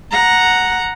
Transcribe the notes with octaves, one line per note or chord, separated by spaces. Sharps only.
F#5 A#5